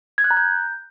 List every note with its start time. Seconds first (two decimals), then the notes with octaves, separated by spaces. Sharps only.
0.18 G#6
0.24 F#6
0.31 A#5
0.37 G6